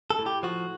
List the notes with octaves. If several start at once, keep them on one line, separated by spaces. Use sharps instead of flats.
A4
A2
G4
F3 F#4